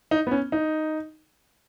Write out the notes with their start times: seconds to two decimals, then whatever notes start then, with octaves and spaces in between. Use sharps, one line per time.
0.11 D#4
0.27 B3
0.31 C#4
0.52 D#4